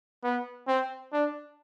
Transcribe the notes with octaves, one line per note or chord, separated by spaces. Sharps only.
B3
C4
D4